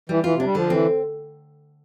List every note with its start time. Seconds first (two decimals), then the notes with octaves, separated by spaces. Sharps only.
0.09 E3 G3
0.24 E3 F4
0.34 C3
0.40 D4
0.45 G3
0.55 D3 F3
0.70 E3 C4